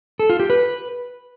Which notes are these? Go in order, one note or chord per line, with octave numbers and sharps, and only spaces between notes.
A4
F4
G4
B4